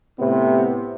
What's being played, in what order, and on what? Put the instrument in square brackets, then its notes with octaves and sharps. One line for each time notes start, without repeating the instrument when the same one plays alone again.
[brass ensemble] A2 C3 B3